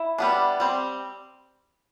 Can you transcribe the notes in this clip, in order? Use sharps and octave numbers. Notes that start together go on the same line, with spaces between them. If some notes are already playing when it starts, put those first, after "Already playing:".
Already playing: E4
G3 B3 D4
G3 C4